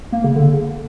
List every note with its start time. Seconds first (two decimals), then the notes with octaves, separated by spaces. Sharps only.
0.12 A#3
0.24 C#3
0.36 D3